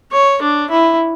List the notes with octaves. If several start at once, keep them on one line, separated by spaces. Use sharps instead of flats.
C#5
D4
E4